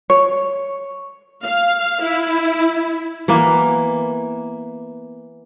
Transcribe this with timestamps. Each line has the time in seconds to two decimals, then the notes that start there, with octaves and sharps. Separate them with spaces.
0.10 C#5
1.44 F5
2.02 E4
3.28 E3 A#3 B3